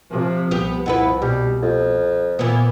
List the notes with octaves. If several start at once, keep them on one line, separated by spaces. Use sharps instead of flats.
C3 F3
C2 B3 G4
F2 B3 E4 B4
B2 G3
F2
A#2 E3 B3